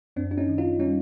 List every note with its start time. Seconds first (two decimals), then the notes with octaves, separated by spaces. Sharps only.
0.16 F#2 C4 D4
0.31 D4
0.37 C#4 D#4
0.48 D#3
0.58 D#4 F4
0.79 G3 C#4 D#4